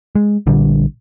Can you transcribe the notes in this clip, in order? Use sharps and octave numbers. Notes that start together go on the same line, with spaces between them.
G#3
A#1 D3 G3